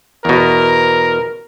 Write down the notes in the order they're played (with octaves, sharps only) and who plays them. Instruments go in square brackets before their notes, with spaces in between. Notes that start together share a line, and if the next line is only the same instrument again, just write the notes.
[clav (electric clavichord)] E2 B2 [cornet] A#4